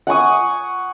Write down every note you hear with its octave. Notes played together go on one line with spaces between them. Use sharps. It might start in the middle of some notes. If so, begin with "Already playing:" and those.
F#5 G#5 C#6 D#6